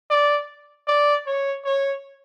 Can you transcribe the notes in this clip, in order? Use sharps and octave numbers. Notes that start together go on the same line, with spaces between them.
D5
D5
C#5
C#5